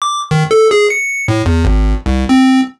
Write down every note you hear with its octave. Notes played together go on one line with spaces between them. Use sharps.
D6
D#3
A4
G#4
C#7
A2
E2
G#1
C2
C4